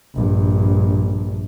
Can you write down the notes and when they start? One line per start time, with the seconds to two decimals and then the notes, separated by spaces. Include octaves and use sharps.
0.15 A#1 G2